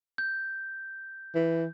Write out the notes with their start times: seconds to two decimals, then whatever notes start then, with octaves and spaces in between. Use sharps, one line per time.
0.18 G6
1.35 E3